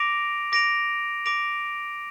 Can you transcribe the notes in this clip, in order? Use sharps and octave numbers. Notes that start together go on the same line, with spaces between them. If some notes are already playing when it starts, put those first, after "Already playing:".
Already playing: D6 A#6 D7 F7
D6 A#6 D7 F7
D6 A#6 D7 F7